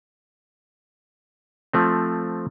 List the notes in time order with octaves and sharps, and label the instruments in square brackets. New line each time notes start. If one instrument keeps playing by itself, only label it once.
[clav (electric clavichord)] F3 A3 C4